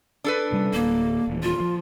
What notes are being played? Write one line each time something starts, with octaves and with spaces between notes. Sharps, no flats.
D4 A4 B4
C3 G3 C#4
D1 A#3
D#1 E3
F4
F3